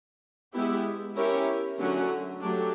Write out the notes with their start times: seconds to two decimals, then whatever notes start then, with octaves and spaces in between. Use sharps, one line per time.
0.53 G#3 B3 E4 G4
1.15 C#4 E4 G4 A#4 C#5
1.79 D3 F#3 A3 C#4 F#4
2.41 F#3 A3 D4 G4